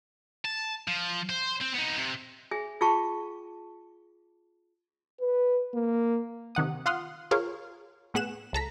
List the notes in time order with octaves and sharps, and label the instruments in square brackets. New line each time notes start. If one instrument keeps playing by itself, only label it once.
[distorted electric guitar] A5
F3
C5
C4
B3 D#4
C3
[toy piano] G#4 E5 G#5
F4 G#4 F5 G5 A5 C#6
[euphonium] B4
A#3
[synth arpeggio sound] C3 D#3 F#5 D#6
F4 F5 F#5 C6 D#6 F6
F4 G#4 A#4 C#5 F5
A2 B3 G#4 F#6 E7
C#2 A4 A#5 B6